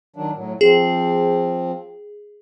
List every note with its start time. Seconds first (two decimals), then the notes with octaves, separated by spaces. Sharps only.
0.16 D#3 F#3 D4
0.35 A2 F#3
0.61 F3 C4 G#4